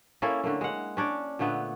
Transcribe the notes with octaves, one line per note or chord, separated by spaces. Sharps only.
A#3 C#4 E4 A4
D3 A3 A#3
G#3 F#5
C#4 D4 C#5 D5
A#2 D3 A3 B3